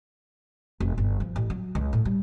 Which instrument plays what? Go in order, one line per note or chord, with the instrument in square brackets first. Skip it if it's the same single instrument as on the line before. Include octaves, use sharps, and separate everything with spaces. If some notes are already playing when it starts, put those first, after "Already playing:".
[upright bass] F1
G1
F3
A1
F#3
C#2
A2
G3